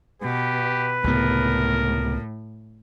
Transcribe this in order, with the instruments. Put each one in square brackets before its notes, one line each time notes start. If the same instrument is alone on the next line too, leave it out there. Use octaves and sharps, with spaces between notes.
[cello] B2 [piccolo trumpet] G4 [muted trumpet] B4
[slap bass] C#2 C3 B3 [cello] A2 [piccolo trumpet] A#4